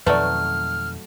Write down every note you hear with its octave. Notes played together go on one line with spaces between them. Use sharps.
F2 B2 D#3 F#3 A3 B4 D5 F6